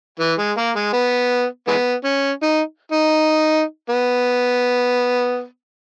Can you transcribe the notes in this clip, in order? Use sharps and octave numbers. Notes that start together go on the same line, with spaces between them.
E3
G#3
A#3
G#3
B3
E3 G#3 B3
C#4
D#4
D#4
B3